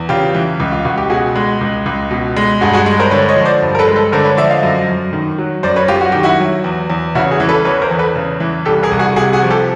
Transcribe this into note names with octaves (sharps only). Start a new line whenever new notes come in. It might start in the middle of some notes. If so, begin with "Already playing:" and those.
Already playing: E2
C#3 F4 G4
E3
C#2
F4
C#2 F#4
G4
B2 F#4 G#4
G#3
C#2
C#2
B2
G#3
G2 F#4 G#4
F#4 G#4
G#3
A#4 C5
D3 B4 C#5
C#5 D#5
F3
C5 D5
G2
A#4
A4 B4
G#3
A4 B4
D3 A#4 C5
B4 C#5
F3 D5 E5
D#5 F5
F#2
F#2
D#3
F#3
F#2 C5 D5
B4 C#5
F#2 F4 G4
F#4
D#3 G4
E4 F#4
F#3
E2
E2
C#3 E4 F#4
F#4 G#4
E3
A4 B4
E2 B4 C#5
A#4 C5
E2
A4 B4
C#3
E3
C2 G4 A4
G#4 A#4
C2
F#4 G#4
C3 F#4 G#4
F#4 G#4
F3
G4 A4